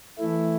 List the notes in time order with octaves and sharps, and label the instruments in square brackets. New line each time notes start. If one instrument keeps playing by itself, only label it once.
[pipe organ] E3 A3 E4